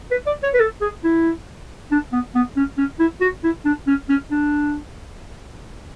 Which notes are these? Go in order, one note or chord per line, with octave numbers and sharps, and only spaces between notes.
B4
D5
C#5
B4
A4
G#4
E4
D4
B3
B3
C#4
C#4
E4
F#4
E4
D4
C#4
C#4
D4